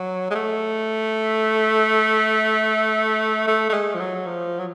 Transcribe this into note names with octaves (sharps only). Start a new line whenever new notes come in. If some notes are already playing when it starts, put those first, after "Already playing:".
Already playing: F#3
G#3
A3
A3
A3
G#3
F3
F#3
F3
F#3